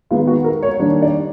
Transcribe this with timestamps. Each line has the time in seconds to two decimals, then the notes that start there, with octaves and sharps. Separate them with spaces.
0.11 D#3 G#3 B3 F4
0.27 F#4
0.44 A#4
0.62 C#5
0.79 D#3 G3 A#3 D4 C#5
1.02 D5